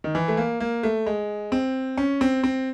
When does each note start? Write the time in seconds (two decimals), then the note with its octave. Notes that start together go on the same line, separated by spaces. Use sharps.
0.04 D#3
0.15 E3
0.28 A3
0.37 A#3
0.60 A#3
0.83 A3
1.06 G#3
1.52 C4
1.98 C#4
2.21 C4
2.44 C4